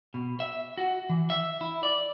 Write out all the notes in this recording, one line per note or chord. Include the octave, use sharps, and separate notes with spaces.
B2
E5
F#4
E3
E5
E4
D5